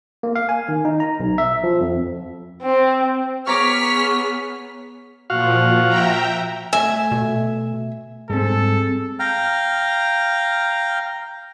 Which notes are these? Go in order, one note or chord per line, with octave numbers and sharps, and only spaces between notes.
A#3
F5
G#5
D#3
D#4
A#5
B1
E5
F3
F2
C4
B3 G#4 C#5 A#5 C#6 D6 F6 B6
A#2 F3 F#4 F5
E5 G5 A#5
A3 E5 G#5
B2
G#2 G3 G#3 C4 A4
F5 G5 A#5 F6